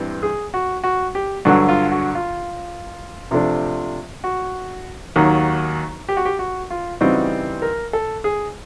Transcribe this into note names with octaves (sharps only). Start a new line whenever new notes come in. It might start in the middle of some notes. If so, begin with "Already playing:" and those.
Already playing: G2 E3 G3 C4
G#4
F#4
F#4
G4
G2 D3 F#3 F#4
F4
F#4
F4
C3 F3 A3 D4
F#4
D#2 D#3 F#3 F#4
G4
F#4
G4
F#4
F4
C#3 E3 G3 C4 D#4 F#4
A#4
A4
G#4